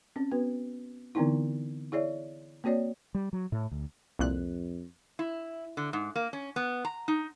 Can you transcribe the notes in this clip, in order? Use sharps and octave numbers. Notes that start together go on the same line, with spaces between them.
C4 C#4
B3 F#4 B4
D3 E3 B3 C4 D#4 E4
E4 G#4 C#5 D5 E5
A#3 C4 F#4 C#5 D5
G3
F#3
A2
D2
C2 F2 A#2 F#6
E4
D3
G#2
A#3
C#4
B3
A#5
D#4